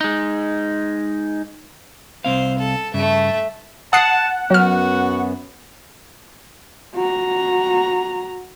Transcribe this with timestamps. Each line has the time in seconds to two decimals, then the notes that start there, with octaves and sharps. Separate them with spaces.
0.01 G#3 D#4
2.25 C2 C4 C5 F5
2.59 A4
2.94 G2 C#3 A3 E5
3.93 F#5 A5 D#6 C7 D7
4.51 F#2 F#3 B3 F#4 F6
6.95 F#4 A#5